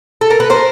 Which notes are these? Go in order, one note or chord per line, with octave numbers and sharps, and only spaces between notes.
A4
A#4
B4
A#4 C5